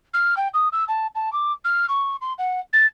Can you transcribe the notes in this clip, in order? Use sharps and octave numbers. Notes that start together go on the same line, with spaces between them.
F6
G5
D#6
E6
A5
A5
D6
F6
C#6
C6
F#5
A6